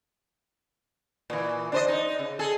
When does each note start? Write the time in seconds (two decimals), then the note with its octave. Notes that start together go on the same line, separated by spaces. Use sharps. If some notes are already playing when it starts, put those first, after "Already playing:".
1.30 A#2 E3
1.72 D4 C5 D#5
1.88 D#4
2.19 C#3
2.39 G#4 A4